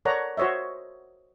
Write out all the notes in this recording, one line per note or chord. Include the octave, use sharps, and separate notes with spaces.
A4 A#4 C#5 D5 F#5 A#5
F#4 C5 C#5 D#5 E5